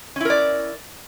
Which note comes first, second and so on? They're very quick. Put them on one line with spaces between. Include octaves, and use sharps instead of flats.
C#4 E4 A#4 D5